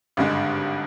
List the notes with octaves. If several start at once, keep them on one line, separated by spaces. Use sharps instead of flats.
G#1 G2 D3 G#3